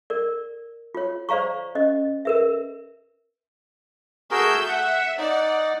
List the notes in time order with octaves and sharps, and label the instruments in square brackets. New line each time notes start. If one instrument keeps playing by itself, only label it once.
[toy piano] A#4 D5
F4 C#5
C5 D5 F5 A#5 C#6
C#4 D#5
A#4 B4 E5
[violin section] A3 E6 G6 [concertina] F#4 G#4 A#4
[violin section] E5 [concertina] F#5
[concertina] D#4 [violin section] D5 F#5